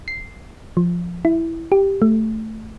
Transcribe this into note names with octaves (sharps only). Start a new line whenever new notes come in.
C7
F3
E4
G4
A3